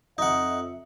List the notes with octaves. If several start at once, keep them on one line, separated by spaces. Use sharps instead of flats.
F2 D#4 E5 F#5